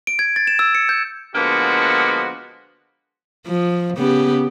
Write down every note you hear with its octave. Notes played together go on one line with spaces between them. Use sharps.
D7
G#6
A6
E7
E6
C#7
G6
D3 F3 G#3 A#3 B3 F#4
F3
C#3 B3 G4